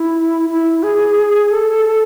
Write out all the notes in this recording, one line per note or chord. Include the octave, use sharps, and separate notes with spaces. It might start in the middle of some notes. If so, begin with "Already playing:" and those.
Already playing: E4
E4
G#4
A4